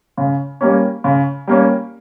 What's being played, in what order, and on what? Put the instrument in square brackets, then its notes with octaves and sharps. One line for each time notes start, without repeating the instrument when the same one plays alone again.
[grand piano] C#3
G3 A#3 C#4
C#3
G3 A#3 C#4